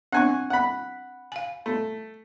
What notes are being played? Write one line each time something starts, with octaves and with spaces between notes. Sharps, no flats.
C4 D4 F#5 G#5 C#6
F#5 B5
F5 G#5
A3